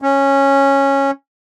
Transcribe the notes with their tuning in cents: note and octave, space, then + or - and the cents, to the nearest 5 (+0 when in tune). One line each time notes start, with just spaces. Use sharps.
C#4 -10